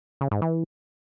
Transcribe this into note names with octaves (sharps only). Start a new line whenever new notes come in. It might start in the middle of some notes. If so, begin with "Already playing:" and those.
C#3
G#2
E3